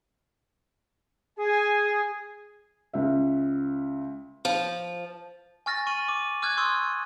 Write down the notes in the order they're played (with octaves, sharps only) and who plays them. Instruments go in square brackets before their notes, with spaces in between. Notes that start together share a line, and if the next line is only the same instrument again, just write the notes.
[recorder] G#4 [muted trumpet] G#5
[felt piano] C#2 E5
[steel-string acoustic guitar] F3
[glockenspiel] G#5 C#6 F6 A6 A#6
C#6 D#7 F#7
D6
D6 F6 F#6 G#6
C6 C#6 D#6 E6 G6